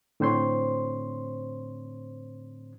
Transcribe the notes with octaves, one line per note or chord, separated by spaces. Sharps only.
A2 D3 C4 C5 C#5 C6